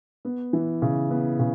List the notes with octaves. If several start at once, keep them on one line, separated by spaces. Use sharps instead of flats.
B3
E3
C#3
B3
C#3